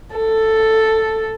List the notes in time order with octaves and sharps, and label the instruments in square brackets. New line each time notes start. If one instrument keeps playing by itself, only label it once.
[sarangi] A4